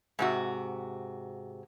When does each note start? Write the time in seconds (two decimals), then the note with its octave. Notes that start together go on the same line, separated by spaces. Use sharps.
0.19 G#2 C3 F#4